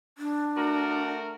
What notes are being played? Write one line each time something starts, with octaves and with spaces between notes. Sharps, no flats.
D4
A3 F#4 A#4